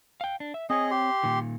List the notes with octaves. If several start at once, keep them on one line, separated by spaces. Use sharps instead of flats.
F5 G5
D4
E5
C4 G#4 C#5 D#5
G4 C6
A#2 D#3